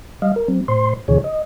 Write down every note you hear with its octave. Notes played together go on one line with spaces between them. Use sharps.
G3 D#5 F5
A#4
F#3 C4
A2 C5 C6
D2 B2 D3 E3 G#4 C#5
D#5